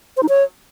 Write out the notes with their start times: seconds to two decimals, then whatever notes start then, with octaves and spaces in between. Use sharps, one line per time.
0.17 C5
0.23 D#4
0.29 C#5